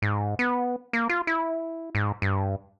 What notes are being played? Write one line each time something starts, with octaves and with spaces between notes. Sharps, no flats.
G#2
B3
A#3
F4
E4
G#2
G2